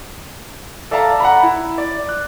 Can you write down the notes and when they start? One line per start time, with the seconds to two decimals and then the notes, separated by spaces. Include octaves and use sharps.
0.91 A4 D5 E5 F5 A5 A#5
1.20 F#5 A#5 B5
1.43 E4
1.78 D5
2.09 F#6